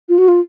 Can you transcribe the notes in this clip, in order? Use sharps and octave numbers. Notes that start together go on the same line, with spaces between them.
F4
F#4
F4